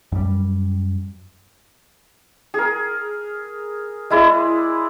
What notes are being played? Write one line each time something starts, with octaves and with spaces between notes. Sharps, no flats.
F#2 G3
G#4 A#4
G#3 E4 G#4 D5